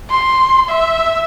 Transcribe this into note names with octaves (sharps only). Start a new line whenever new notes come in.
C6
E5